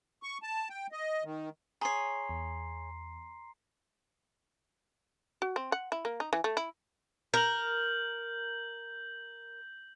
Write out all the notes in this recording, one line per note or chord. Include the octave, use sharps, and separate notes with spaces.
C#6
A5
G5
D#5
D#3
G#4 C#5 A#5 C6 C7
E2
F#4
C4
F#5
E4
A#3
D#4
E3
A3
E4
A#4 G6 F#7